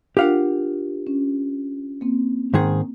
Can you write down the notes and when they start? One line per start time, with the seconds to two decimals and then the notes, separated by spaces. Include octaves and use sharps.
0.17 D4 F4 G4 A#4 F5 F#5
1.07 C#4
2.01 A#3 C4
2.54 G#2 D#3 G#4